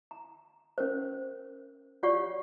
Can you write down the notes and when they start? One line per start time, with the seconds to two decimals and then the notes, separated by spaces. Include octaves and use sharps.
0.11 A#5
0.78 C#4 A#4 C5
2.03 F4 G4 C#5 D5 F#5 C#6